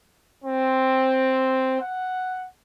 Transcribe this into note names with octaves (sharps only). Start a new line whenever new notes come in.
C4
F#5